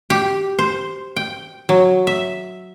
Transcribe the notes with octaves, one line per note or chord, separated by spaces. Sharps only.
G4
C5
G5
F#3
E5